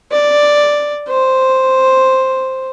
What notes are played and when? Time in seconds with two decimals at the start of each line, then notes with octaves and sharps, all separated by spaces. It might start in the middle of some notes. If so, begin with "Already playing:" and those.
0.11 D5
1.09 C5